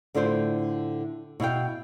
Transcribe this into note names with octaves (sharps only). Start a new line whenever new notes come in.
A2 D3 E4 F4 C5
B2 E4 F5 G5